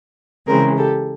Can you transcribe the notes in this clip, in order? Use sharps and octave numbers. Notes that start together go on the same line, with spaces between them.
C#3 E3 G#3 C4 G#4 A#4
G4 A4